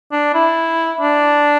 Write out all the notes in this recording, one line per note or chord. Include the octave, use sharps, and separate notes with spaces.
D4
E4
D4